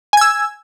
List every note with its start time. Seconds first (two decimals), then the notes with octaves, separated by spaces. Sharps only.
0.13 G#5
0.17 G#6
0.21 E6